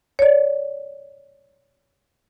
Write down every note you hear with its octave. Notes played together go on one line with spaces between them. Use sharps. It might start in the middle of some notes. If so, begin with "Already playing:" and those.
C#5 D5